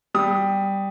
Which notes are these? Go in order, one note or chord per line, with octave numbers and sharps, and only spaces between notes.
G3 D#6